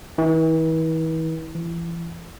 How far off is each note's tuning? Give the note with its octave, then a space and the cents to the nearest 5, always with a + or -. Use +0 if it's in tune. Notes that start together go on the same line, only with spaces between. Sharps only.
E3 -40
E3 +35